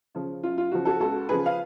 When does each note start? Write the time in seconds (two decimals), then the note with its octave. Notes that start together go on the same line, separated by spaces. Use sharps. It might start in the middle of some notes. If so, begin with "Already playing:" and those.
0.15 C#3 F3
0.43 F#2 F4
0.58 F4
0.71 C#3 F3 F#4
0.85 F#4 A4
1.00 C#2 F#4 A4
1.29 C#3 F3 G#4 B4
1.46 F5